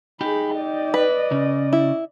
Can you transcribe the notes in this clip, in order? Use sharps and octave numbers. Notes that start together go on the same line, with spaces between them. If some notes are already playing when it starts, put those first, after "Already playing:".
D#4 G4 G#4 B5
D5 D#5
B4
C#3
E4